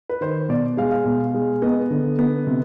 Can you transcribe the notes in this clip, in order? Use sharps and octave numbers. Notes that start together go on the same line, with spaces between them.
B4
D#3 C5
B2 D5
G#3 F5
F5
B2
G#3
B3 D#5
D3
B3
C3